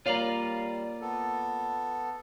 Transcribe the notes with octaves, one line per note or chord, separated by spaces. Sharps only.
G3 A#3 F4 C#5 D5 F5 A#5 F#7
B3 A4